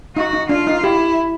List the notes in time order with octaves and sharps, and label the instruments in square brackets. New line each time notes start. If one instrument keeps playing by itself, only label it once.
[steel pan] D#4 [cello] F#4
[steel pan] D#4
[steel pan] D4 [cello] F4
[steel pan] D#4
[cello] E4 [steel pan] G4